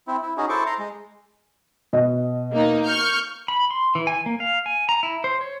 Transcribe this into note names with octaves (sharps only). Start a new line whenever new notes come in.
C4 E4
E4
C#4 D#4 F#4 G#4
E4 A4 C5 C#6 D6
A#5 C6
G#3
B2 D#5
A#3 D#4
C#6 F6 G6
B5
C6
E3
G#5
A#3
F5
G#5
A#5
E4
C5
C#5